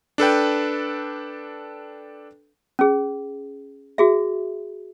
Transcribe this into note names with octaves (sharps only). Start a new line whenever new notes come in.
D4 A4 B4 G5
C#4 G#4
F#4 G#4 E5